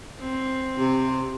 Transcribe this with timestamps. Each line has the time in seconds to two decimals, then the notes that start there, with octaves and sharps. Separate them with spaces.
0.19 C4
0.78 C3